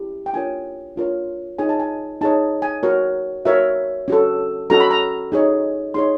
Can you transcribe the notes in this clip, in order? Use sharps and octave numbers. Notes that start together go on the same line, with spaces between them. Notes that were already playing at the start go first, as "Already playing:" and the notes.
Already playing: C#4 E4 G4
G5
D4 F4 A#4 C#5 G#5
D4 F4 A#4 C#5
D#4 G#4 C#5 G#5
A5
G#5
D#4 G#4 C#5 A5
G#5
F#4 A#4 C#5
F#4 A#4 C#5 E5
C#4 F#4 A4
C#4 F#4 A4 A#5
B5
A#5
D#4 G#4 C#5
D#4 G#4 C#5 C6